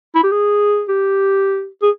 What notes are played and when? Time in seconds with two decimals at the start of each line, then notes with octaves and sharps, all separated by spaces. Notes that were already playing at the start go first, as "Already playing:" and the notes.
0.15 E4
0.23 G4
0.31 G#4
0.89 G4
1.82 G#4